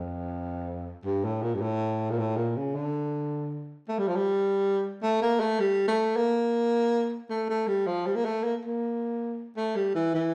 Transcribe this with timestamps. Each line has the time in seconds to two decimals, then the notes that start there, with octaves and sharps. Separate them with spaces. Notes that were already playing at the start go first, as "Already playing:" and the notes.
Already playing: F2
1.05 G2
1.24 A2
1.42 A#2
1.55 G2
1.61 A2
2.10 A#2
2.19 A2
2.37 A#2
2.57 C#3
2.75 D3
3.89 A3
3.99 G3
4.08 F3
4.16 G3
5.02 A3
5.22 A#3
5.40 A3
5.60 G3
5.88 A3
6.17 A#3
7.30 A3
7.49 A3
7.67 G3
7.87 F3
8.06 G3
8.16 A#3
8.25 A3
8.44 A#3
8.65 A#3
9.57 A3
9.76 G3
9.95 E3
10.15 E3